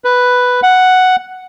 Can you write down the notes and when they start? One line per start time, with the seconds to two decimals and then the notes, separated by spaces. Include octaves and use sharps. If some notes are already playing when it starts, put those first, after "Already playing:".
0.04 B4
0.63 F#5